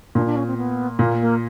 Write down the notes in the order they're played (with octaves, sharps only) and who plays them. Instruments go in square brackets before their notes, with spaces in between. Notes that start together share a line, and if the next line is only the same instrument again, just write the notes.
[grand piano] A#2 [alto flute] D4
[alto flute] D4
C#4
C4
B3
[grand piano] A#2 [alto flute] A#3
[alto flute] A#3